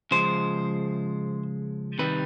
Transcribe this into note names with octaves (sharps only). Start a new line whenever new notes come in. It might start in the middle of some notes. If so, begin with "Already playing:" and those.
C#3 F3 G#3 C5
C3 D#3 G3 B4